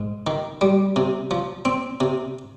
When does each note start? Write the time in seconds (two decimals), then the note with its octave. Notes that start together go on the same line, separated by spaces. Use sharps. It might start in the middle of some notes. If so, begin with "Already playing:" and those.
Already playing: G#2
0.27 D#3
0.61 G3
0.96 C3
1.31 F3
1.65 C4
2.00 C3